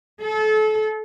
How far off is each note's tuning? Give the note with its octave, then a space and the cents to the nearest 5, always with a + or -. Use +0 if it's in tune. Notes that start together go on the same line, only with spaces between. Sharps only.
A4 -30